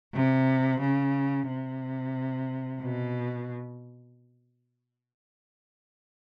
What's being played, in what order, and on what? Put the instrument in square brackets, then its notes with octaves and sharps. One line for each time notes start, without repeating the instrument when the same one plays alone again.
[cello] C3
C#3
C3
B2